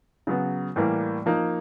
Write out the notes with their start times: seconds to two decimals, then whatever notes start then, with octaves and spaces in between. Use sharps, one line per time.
0.27 C#3 F#3 B3
0.76 A2 E3 G3 A#3
1.26 F3 A#3 D#4